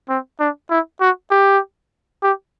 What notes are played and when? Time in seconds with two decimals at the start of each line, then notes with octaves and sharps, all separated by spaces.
0.09 C4
0.40 D4
0.70 E4
1.01 F#4
1.31 G4
2.23 G4